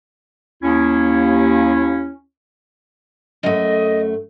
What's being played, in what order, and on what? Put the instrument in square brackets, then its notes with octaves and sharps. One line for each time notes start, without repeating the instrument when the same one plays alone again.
[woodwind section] D#2 C#4 E4
[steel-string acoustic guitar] F#2 A3 [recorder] D#5